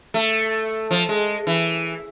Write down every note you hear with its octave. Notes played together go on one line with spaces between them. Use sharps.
A3
F3
G#3
E3